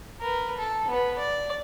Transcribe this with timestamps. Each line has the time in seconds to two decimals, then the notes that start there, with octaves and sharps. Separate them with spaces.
0.21 A#4 B4
0.58 A4
0.88 B3 B4
1.19 D5